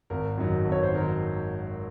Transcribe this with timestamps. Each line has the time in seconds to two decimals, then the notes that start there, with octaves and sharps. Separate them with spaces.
0.10 G#1 A#4
0.37 F#2 D#3 F#3
0.65 G#1
0.72 C#5
0.83 C5
0.93 D#3 F#3 A#4